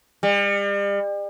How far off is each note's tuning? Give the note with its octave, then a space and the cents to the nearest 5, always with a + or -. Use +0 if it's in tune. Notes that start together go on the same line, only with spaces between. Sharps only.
G3 +40